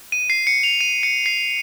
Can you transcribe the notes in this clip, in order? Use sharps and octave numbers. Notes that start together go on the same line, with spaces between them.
D#7
C7
C#7
F7
D#7
C#7
C7